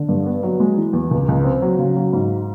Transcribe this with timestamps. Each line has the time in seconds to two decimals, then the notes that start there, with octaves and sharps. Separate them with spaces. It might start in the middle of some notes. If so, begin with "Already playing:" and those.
Already playing: D3
0.09 G2
0.26 B3
0.43 F#3
0.60 G#3
0.77 E3
0.93 E2
1.11 C#2
1.28 C#2
1.44 C4
1.62 F#3
1.78 C#3
1.96 F#3
2.13 G#2